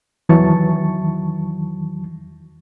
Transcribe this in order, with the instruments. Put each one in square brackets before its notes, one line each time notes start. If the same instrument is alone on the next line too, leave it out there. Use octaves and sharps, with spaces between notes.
[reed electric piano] E2 D#3 E3 F#3 A5 C#6